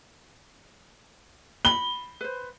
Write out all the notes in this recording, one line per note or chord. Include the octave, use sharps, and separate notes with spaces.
B5 G7
B4 C5